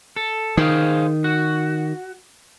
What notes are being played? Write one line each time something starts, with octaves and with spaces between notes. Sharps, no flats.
A4
D#3 G#4 C5 F5
F#4